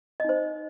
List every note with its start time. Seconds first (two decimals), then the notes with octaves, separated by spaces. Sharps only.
0.20 D#5
0.24 D#4
0.29 C5